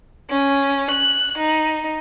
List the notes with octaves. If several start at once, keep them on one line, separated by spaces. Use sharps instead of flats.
C#4
F#6
D#4